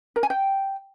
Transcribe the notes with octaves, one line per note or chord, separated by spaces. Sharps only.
A#4
G#5
G5